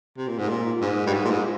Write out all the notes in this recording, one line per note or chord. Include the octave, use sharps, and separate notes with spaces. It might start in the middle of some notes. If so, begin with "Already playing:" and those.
C3
A#2
G#2
A#2
G#2
G2
G#2
A#2
G#2